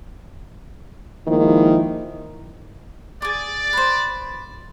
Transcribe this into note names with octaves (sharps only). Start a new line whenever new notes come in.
D#3 F3 G#3 A#3 E4
G#4 D5 D6
B4 C5